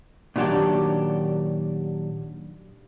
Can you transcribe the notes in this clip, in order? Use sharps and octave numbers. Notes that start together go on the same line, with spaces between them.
A#2 D#3 F#3 D4 G4